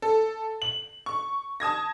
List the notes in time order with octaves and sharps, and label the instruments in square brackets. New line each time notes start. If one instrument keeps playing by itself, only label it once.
[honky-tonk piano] A4
F#7
C#6
A5 D#6 G#6 A#6